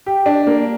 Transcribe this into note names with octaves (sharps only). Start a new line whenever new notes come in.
G4
D4
A#3